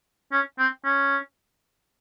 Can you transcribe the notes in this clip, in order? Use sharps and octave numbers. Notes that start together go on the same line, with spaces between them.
C#4
C4
C#4